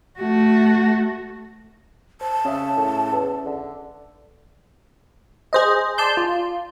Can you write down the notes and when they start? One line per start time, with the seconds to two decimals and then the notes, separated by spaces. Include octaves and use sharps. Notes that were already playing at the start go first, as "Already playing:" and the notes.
0.19 A3 F#4
2.21 C5 A5
2.45 C#3 C#4 G#4 E5
2.77 A2
3.12 E2
3.46 D3
5.53 G#4 C5 D#5
5.98 D5 A5 C6 G6
6.17 F4